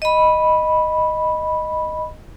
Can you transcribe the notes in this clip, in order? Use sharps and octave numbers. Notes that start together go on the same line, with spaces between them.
D#5 B5